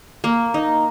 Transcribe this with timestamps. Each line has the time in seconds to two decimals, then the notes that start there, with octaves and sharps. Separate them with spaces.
0.24 A#3
0.54 D#4